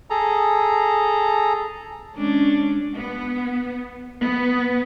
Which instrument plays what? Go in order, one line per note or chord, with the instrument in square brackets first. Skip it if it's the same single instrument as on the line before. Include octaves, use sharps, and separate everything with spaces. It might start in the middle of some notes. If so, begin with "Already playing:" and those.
[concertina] G#4 A4 A#5
[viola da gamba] G#3 C#4 D4
[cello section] B3
B3